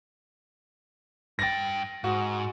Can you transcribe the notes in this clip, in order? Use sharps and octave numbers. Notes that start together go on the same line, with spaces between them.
G2 G5 A6 A#6
G#2 F#4